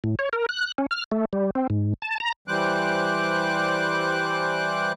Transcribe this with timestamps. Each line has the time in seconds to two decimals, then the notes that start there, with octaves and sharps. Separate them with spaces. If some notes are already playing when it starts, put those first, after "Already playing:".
0.04 A2
0.19 C#5
0.33 A#4
0.49 F#6
0.78 C#4
0.91 F6
1.12 A3
1.33 G3
1.55 C4
1.70 G#2
2.02 A5
2.20 A#5
2.48 E3 G3 C5 D6 F#6